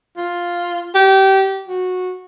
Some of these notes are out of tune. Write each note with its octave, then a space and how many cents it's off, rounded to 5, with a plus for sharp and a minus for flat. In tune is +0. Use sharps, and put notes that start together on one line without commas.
F4 +5
G4 -25
F#4 -15